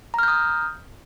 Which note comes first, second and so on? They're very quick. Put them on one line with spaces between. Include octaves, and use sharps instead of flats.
A#5 F6 G6 D#6